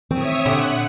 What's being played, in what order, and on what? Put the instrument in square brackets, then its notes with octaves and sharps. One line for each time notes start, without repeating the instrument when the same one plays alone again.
[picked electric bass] D#3 E3 A3 [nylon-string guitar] C4 [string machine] C#5 E5 D#6
[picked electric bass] A#2 [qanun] D3 G4 A4 [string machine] F#5